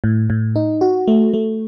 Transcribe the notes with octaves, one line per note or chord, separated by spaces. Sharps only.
A2
A2
D#4
F#4
A3
A3